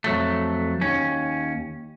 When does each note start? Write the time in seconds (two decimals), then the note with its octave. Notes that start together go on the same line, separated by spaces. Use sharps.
0.04 F2 F#3 A3
0.81 D#2 C#4